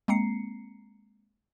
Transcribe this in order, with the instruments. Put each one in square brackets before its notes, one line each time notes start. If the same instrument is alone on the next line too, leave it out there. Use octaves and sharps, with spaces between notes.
[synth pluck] G#3 A#3 C4 A#5 C7 C#7